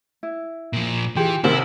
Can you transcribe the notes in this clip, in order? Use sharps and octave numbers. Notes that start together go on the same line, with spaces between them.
E4
A#2 F3
E3 F4 G4 G#4
A1 C3 D#3 E4 C5